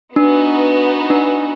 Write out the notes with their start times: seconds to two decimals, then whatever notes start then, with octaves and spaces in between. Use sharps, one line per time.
0.16 B3 D4 D#4 F#4
1.10 D4